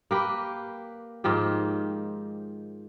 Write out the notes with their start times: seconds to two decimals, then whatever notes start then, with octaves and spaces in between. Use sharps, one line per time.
0.11 A#3 G4 B4
1.24 G#2 D#3 F3 G4